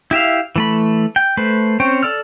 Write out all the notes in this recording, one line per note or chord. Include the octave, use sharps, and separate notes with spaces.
E4 G4 E5 F5
E3 A3 B5
G5
A3 B4 C5
C4 C#4 C5 C#5 G5
A4 D5 E6 F6